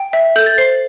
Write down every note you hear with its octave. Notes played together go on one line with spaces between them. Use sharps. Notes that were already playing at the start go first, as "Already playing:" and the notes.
Already playing: G5
E5
A4 G6
A6
C5 C7